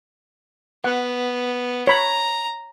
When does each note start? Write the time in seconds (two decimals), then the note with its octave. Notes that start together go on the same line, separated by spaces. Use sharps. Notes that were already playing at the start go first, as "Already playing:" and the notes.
0.84 B3 F#5
1.87 C#5 A#5 B5